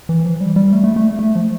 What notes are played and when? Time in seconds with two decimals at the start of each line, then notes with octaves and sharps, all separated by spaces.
0.09 E3
0.25 F3
0.41 G3
0.56 G3
0.72 A3
0.84 A3
0.96 A3
1.19 A3
1.35 F3